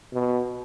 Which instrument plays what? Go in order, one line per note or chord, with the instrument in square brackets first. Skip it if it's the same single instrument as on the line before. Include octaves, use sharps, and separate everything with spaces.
[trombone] B2